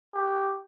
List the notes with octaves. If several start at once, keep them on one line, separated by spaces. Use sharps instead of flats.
G4